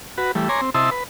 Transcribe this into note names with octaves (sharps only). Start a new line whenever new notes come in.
F#4 B4
E3 G3 A3
C#5 G#5 A#5 C6 D6
C4
C3 E4 D#5 E5 A5 C6
B4